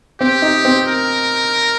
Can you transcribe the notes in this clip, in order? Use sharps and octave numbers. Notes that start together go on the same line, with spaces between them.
C4 G4
D#4
C4
A#4